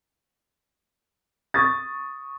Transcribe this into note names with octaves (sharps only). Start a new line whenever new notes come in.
C#6 D#6 A6